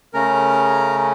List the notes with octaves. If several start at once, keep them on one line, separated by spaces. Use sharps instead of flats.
C#3 A3 C#4 A#4 A#5